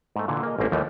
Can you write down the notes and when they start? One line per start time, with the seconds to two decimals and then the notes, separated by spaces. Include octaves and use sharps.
0.16 G#2 A3
0.28 A#2 D3 E3
0.43 A#3 G#4 D#5
0.59 A1 G#2 A#3 C4 E4
0.72 D#2 E3 F3 G3 A3